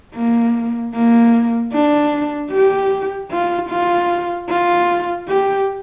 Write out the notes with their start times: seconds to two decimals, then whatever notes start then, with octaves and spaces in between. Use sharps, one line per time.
0.15 A#3
0.94 A#3
1.73 D4
2.51 G4
3.31 F4
3.70 F4
4.49 F4
5.28 G4